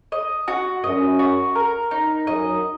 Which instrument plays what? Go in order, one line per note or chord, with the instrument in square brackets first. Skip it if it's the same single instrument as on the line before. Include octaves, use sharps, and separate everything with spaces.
[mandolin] D#5
F#4
[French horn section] F#2 [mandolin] D#5
[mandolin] F#4
A#4
D#4
[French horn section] F#2 [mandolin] D#5